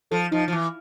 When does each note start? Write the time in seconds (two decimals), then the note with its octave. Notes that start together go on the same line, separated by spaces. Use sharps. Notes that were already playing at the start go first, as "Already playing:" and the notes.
0.11 F3 A4
0.31 F3 D#4
0.48 F3
0.52 E3